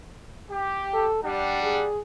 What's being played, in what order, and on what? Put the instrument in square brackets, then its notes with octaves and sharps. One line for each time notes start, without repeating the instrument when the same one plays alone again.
[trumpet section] G4
[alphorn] A4
[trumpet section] G3 D4 F#5 [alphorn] G4
[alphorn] G#4